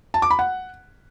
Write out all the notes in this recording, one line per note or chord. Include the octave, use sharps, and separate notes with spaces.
A5
D6
B5
F#5